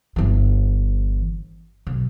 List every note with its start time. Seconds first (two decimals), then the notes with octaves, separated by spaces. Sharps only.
0.16 G1 E3
1.87 B1